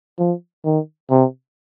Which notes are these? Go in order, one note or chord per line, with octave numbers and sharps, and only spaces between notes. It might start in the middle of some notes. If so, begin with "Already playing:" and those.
F3
D#3
C3